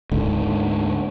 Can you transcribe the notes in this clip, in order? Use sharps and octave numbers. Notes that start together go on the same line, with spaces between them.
D2 G#2 D3